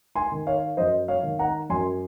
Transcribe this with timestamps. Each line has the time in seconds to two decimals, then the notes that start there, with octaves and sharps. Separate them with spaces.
0.15 G#5 C6
0.32 D#3
0.47 C#5 F5
0.77 F#2 C5 D#5
1.08 C#5 F5
1.23 D#3
1.39 F#5 A#5
1.70 F#2 G#5 C6